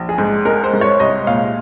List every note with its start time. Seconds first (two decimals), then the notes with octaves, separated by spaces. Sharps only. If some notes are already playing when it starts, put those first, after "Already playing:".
Already playing: A#1
0.09 G#4
0.18 G#2
0.45 G#3 A#4
0.64 C5
0.73 G#2
0.81 C#5
1.00 C2 D#5
1.27 A#2 F5